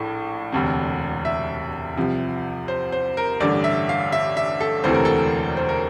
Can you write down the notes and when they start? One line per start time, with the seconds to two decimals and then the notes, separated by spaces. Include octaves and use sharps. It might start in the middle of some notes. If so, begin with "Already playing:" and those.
Already playing: A#1 A2
0.52 E1 D2 C3
1.25 E5
1.97 C2 C3 F3
2.68 C5
2.92 C5
3.17 A#4
3.40 A1 G2 D3 D5
3.64 E5
3.89 F5
4.12 E5
4.37 E5
4.60 A4
4.84 E1 D2 C3 E3 A3 C5
4.94 A#4
5.05 A4
5.16 A#4
5.57 C5
5.69 A#4